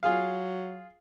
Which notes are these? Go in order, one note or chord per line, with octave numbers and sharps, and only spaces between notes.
F#3 F4 G#4 F5